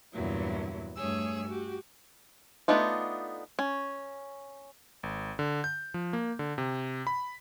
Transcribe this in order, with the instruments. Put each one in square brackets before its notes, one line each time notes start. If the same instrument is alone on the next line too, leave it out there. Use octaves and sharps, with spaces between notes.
[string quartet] E2 G2 A#2 F#3 E4
G2 A3 G#4 C#5 G#5 E6
F#4 G4
[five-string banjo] A3 B3 D4 D#4 F4
C#4
[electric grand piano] G#1
D3
G6
F3
A#3
D3
C3
B5